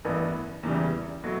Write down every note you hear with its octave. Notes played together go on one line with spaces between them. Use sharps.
A1 G2 E3 B3
E2 C#3 E3 G3
B2 F#3 A3